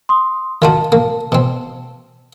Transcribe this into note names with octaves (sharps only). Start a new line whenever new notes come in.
C6 D#6
D#3 F4 F#4 F5 A5
A#3
B2 C4